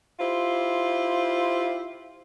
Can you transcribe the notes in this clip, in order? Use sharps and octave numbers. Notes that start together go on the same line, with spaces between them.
E4 F4 G4 C5